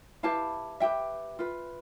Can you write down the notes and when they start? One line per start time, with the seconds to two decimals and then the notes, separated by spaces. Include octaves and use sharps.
0.23 E4 G4 B4 F5 A5
0.80 E4 G4 B4 E5 G5
1.39 F4 B4